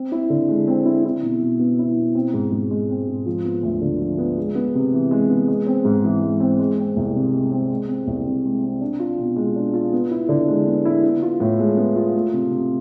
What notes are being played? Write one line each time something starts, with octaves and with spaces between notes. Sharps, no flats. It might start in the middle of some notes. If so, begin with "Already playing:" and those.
Already playing: C4
E4
D3
G#3
C4
E4
E4
B2
B2
B3
E4
B2
C4
G#2
G#2
G#3
C4
G#2
F3
B3
D2
D3
F3
B3
G#3
B3
C3
E3
G#3
B3
G#3
C4
G#2
E3
G#3
C4
G#3
C4
C2
C3
G#3
C4
G#3
C4
C2
C3
G#3
C4
D4
F4
B2
G#3
D4
F4
B3
E4
D3
G#3
B3
E4
B3
F4
A2
G#3
B3
F4
A3
C3
C3